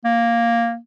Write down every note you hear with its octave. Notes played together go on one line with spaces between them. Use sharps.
A#3